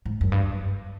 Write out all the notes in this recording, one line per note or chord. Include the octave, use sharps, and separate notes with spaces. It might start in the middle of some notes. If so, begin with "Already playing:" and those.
G#2
F#2
G2